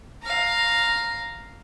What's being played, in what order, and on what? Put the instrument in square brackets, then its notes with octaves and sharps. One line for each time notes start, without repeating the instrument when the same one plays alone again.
[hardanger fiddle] F5 A#5